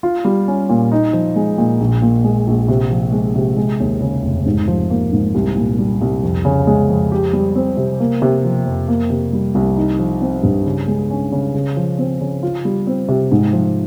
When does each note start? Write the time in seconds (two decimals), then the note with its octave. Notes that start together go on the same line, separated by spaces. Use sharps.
0.03 F4
0.25 G3
0.48 C#4
0.69 A#2
0.92 D#4
1.13 F3
1.36 G#3
1.58 A#2
1.80 A#1
2.02 A#2
2.24 G#3
2.47 A#1
2.68 C3
2.91 F3
3.12 G#3
3.36 C3
3.57 G#3
3.80 D#2
4.01 C#3
4.23 F1
4.46 G#2
4.68 F3
4.90 A#3
5.12 G#2
5.35 C2
5.57 A#2
5.79 G3
6.01 C2
6.23 F2
6.45 C#3
6.67 G#3
6.89 F2
7.12 G4
7.33 G3
7.55 C4
7.77 C3
8.00 A#3
8.22 C3
8.45 F3
8.66 F2
8.88 A#3
9.10 C3
9.33 G3
9.55 C2
9.76 D#4
9.99 F3
10.21 C4
10.43 G2
10.66 C#3
10.88 G#3
11.10 C#4
11.32 C#3
11.55 C#3
11.77 F3
11.98 C4
12.21 C#3
12.43 F4
12.65 G3
12.87 C4
13.09 C3
13.32 G#2
13.53 F3